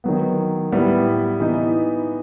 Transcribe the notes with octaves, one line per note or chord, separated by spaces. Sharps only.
D#3 F#3 B3
A2 G3 B3
E3 B3 D#4